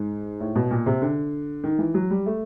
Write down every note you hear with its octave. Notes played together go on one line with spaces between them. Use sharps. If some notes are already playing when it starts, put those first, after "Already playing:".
Already playing: G#2
A2
B2
A#2
C3
D3
D#3
E3
F#3
G3
A3